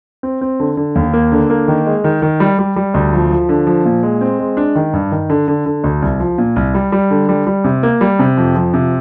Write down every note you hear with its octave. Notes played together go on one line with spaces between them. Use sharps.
C4
C4
D3
D3
D#2
A#3
D3
A#3
D#3
G#3
D#3
D#3
G3
G3
G3
D2
F3
F3
D3
F3
A#2
G#3
C4
G#3
D4
D#3
G2
D#3
D3
D3
D3
D2
C2
F3
A#2
C2
G3
G3
D3
G3
G3
C3
A#3
G3
C3
F2
F3
C3